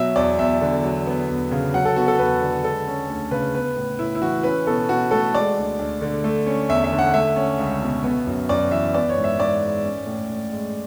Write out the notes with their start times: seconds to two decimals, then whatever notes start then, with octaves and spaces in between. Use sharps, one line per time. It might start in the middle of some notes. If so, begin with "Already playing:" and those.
Already playing: B2 F#3 E5
0.16 E2 D5
0.39 E2 E5
0.61 D3
0.84 F#3
1.06 B3
1.29 E2
1.51 C#3
1.74 F#3 F#5
1.85 A4
1.96 B3 F#4
2.08 A4
2.19 E2 B4
2.41 D3
2.63 G#3 A4
2.87 C#4
3.09 D2
3.31 C#3 B4
3.54 B3 B4
3.76 A2
3.99 A2 E4
4.15 E4
4.21 E3 F#4
4.43 C#4 B4
4.67 B2 A4
4.89 B2 F#4
5.11 A3 A4
5.34 G#3 D5
5.57 D2
5.79 D2
6.02 D3
6.24 A3
6.46 C#4
6.69 E2 E5
6.84 E5
6.92 D3
6.99 F#5
7.14 A3 E5
7.36 C#4
7.59 C#2
7.82 B2
8.04 B3
8.27 F#2
8.49 F#2 D5
8.71 E3 E5
8.94 B3 D5
9.09 C#5
9.17 G#2
9.24 E5
9.39 G#2 D5
9.62 G#3
9.84 C#4
10.06 A2
10.29 A2
10.52 G#3